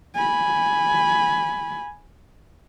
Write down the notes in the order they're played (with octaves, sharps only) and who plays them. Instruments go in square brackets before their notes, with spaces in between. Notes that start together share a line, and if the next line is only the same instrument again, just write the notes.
[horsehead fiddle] G#5 B5